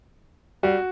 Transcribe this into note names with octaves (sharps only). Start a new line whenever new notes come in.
G3 F#4